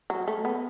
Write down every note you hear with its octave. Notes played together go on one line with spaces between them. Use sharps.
F#3
A3
B3